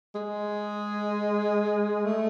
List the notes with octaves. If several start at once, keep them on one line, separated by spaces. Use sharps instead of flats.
G#3
A3